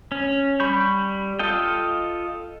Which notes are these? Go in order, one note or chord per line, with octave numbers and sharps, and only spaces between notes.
C#4
G3 B5 C#6 G6
F4 A4 D#5 G5